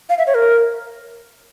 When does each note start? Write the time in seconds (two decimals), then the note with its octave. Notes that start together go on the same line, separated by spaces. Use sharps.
0.09 F5
0.18 E5
0.27 C#5
0.34 A#4